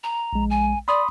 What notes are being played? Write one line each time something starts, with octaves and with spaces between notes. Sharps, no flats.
A#5
A#1 G#3
G#5
D5 B5 C6 D#6